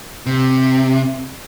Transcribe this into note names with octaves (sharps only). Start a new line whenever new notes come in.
C3